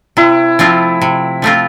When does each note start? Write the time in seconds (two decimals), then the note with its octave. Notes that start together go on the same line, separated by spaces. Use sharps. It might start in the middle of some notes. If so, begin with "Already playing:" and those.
0.17 C3 E4
0.59 F3 A3 C4 F4
1.02 C3
1.42 F3 A3 C4 F4